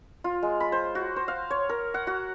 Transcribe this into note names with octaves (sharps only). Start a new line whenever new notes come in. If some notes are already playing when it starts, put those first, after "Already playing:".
F4
G#3
B5
C5
F#4
C5
F5
C#5
A#4
F#5
F#4